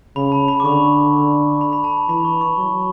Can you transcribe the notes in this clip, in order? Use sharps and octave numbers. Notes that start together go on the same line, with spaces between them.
C#3 B5
A5
B5
D6
D3 C#6
B5
B5
A5
A5
E3 B5
C#6
C#6
F#3